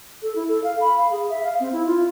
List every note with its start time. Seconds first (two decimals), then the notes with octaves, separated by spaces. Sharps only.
0.22 A4
0.36 E4
0.48 A4
0.64 F5
0.81 B5
0.97 F5
1.11 G#4
1.30 E5
1.43 F5
1.60 C4
1.73 E4
1.86 F4